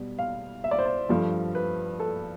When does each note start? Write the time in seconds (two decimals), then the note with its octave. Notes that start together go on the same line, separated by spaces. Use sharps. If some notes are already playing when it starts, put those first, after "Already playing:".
Already playing: B2 G3
0.19 F5
0.64 E5
0.71 D5
0.79 C5
0.86 D5
1.09 G2 F3 A3
1.55 B4
2.00 A4